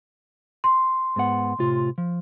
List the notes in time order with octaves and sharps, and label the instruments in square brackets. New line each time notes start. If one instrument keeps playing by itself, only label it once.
[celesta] C6
[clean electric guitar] G#2 B3 F#5
A2 C3 F4
F3